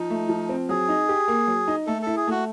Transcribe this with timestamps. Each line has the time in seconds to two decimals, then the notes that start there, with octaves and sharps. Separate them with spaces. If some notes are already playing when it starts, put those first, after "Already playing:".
Already playing: F3 D#4
0.10 A3
0.29 F3
0.49 C4
0.69 F#3 G#4
0.89 D#4
1.09 G4
1.28 A#3
1.47 F#3
1.68 D#4
1.87 A3 A4
2.02 E4 A4
2.16 G#4
2.27 A3 F#4